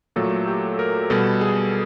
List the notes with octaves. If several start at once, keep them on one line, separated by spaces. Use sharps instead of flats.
A#2 F#3 A3 A4
G4
A#4
B2 G3 A4
G#4